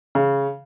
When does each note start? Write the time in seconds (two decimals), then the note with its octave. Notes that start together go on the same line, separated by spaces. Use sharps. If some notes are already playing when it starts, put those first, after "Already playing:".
0.15 C#3